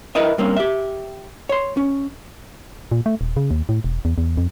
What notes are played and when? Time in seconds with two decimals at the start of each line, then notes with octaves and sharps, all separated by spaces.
0.15 E4 A#4 B4 D#5 E5
0.38 G2 A#3 C4 C#4
0.56 G4 E5
1.49 C#5 C6
1.77 C#4
2.92 A#2
3.06 A3
3.21 D#1
3.36 C#3
3.51 D#2
3.69 A2
3.84 E1
4.05 E2
4.18 E2
4.37 F2